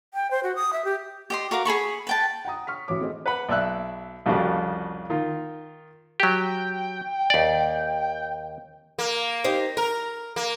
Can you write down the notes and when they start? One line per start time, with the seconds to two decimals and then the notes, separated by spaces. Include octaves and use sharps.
0.14 G5
0.31 C5
0.43 F#4
0.55 D#6
0.73 E5
0.85 G4
1.30 G4 D#5 C6
1.51 F#4 A#4 F5 D6
1.65 G#4 A4 B5 C#6
2.07 B4 G5 A5
2.45 F#5 G5 A#5 D#6
2.67 C#6 F6 B6
2.88 A1 E3 F#4 C#5 D6
3.00 A3 C4 G#4 C5 D#5
3.26 B4 F#5 B5
3.49 B1 D5 E5 E6 F#6
4.26 C2 F2 C#3 F3 F#4 G4
5.10 D#3 F4
6.20 F#3 G4 G5
7.30 D#2 D5
8.99 A#3
9.44 D#4 G4 C5
9.77 A#4 A#5
10.36 A#3